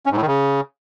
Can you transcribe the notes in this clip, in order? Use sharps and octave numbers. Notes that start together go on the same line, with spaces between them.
C#4
G#2
A2
D#3
C#3